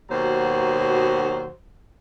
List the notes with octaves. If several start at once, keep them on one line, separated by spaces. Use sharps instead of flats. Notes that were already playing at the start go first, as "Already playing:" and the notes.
D#2 B2 F#3 F#4 C5